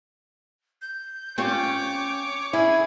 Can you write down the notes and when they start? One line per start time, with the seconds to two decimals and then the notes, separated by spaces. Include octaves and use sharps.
0.82 G6
1.38 C4 C#4 F4 C#5 D6
2.53 C#4 E4 G#4 G#6